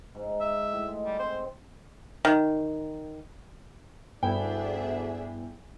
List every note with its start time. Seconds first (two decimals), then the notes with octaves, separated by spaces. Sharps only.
0.15 G#2
0.40 E5
0.72 A2
0.88 G#3
1.05 G3
1.19 C4 C5
2.25 D#3
4.23 D2 G2 B3 D4 E4 G#4 E5 G5